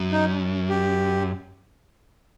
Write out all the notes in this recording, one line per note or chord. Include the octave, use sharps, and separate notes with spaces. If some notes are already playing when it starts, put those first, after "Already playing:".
Already playing: F#2
D#4
G4